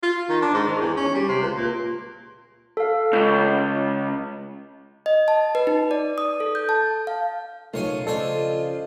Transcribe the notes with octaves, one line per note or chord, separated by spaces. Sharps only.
F4
D#3
D4
G#2
D#3
E2
C#4
G3
C3
C#2
A#2
A4 F5
C#2 G6
D#5
A5
B4
D#4
D5
D#6
A4
G6
A5
F5
B1 C#3 A3 F4 A#4 C#5 G#5
C#3 F3 D4 A4 C5 D#5 G#5